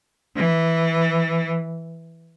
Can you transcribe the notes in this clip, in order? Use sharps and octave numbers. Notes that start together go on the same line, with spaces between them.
E3